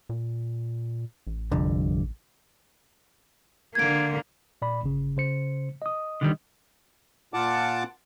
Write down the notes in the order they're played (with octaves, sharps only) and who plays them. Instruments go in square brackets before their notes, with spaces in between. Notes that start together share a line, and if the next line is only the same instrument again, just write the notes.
[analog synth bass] A#2
A1
[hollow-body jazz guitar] C2 F2 D3
[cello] D3 A#3 [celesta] G#6 D7
[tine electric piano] A#2 D5 B5
G1 C#3
C#3 C5 C#7
D#5 D#6
[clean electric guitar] D3 D#3 G3
[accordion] A#2 F4 F#5 A5 D6